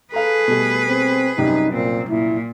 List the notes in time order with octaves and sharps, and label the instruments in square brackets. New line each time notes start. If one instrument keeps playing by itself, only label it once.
[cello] G#4 B4 [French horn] A4 [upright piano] F5 A#5
[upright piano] B2 G3 A3
[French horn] C4
[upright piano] C2 F#2 G4 [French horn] D#4
[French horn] A#2 [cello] C4
[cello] A#2 [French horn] E4